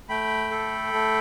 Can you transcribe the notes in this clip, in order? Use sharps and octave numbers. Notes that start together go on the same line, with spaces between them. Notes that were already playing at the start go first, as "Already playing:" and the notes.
A3 G5 B5
A4
A3